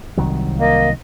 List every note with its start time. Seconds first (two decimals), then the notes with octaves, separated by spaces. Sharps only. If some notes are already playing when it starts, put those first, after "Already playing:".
0.17 C2 D#3 F#3
0.59 A#3 D#5